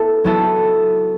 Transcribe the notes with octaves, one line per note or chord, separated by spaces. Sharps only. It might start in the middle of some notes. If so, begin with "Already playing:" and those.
Already playing: B3 E4 A4
F#3 B3 E4 A4